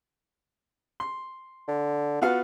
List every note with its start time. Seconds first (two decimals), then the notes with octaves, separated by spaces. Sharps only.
1.00 C6
1.68 D3
2.22 B3 F4 F#4 F5